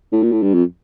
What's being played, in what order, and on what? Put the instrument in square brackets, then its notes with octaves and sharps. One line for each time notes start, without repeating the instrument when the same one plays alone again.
[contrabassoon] A2
A#2
A2
G2
F2